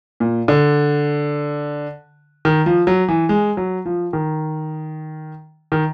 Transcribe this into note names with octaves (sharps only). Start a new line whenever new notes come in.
A#2
D3
D#3
F3
F#3
E3
G#3
F#3
F3
D#3
D#3